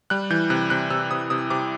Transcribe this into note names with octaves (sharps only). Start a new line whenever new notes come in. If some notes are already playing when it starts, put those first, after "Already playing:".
G3 F#6
E3 G6
C3 F#6
C3 F#6
C3 E6
C3 D#6
C3 D#6
C3 D6